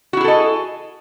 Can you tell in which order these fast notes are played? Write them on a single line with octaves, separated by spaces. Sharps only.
F#4 E4 G#4 A4 D#5